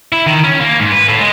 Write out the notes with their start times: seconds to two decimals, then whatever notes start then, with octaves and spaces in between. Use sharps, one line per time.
0.12 E4
0.27 D#3
0.44 C#4
0.61 A#3
0.80 G#2
0.92 B4
1.08 A2
1.19 G#3